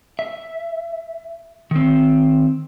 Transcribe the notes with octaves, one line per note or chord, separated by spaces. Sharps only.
E5
D#3 C4